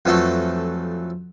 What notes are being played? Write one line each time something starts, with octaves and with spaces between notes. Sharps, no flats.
F2 E3 F#3 A3